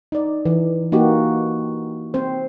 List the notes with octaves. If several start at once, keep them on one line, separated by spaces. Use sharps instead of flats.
D#4 D5
E3
A#3 D#4 F#4 G4
C4 C5